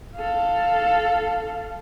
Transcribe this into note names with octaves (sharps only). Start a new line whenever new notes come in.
A4 F5